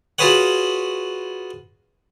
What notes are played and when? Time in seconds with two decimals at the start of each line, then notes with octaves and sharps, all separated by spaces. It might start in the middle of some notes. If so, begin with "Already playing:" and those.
0.19 F4 F#4 G#4 B4 C#5 F#5